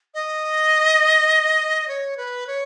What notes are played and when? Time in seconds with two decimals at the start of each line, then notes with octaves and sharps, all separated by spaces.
0.14 D#5
1.88 C#5
2.17 B4
2.47 C#5